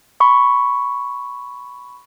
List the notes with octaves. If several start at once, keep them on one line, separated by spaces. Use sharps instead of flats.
B5 C#6